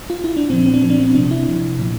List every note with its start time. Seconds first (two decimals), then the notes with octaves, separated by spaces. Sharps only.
0.10 F4
0.24 E4
0.37 D4
0.50 A#2 F3 C4
0.66 C4
0.74 D4
0.82 A#2 F3 C4
0.90 D4
0.99 C4
1.15 C3 F3 D4
1.31 E4
1.47 C3 F3
1.79 A#2 F3